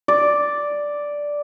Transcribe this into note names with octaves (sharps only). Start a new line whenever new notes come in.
D5